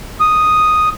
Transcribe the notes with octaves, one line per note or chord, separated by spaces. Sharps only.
D#6